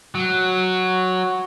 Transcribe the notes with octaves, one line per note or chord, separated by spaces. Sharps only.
F#3